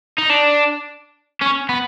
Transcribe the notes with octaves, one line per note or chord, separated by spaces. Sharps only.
D#4
D4
C#4
B3